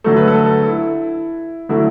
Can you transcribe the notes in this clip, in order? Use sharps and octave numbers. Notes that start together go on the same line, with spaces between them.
D3 F#3 A3 A4
B4
A4
A4
E4
D3 F#3 A3 E4